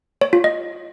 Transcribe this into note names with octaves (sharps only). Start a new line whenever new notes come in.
C#5
F4
D#5